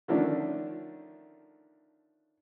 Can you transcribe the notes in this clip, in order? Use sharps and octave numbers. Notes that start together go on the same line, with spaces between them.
D3 D#3 F3 A3 C#4 D4